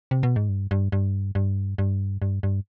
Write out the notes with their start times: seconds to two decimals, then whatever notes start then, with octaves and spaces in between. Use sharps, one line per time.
0.11 C3
0.23 B2
0.36 G#2
0.49 G2
0.71 G2
0.92 G2
1.35 G2
1.78 G2
2.22 G2
2.43 G2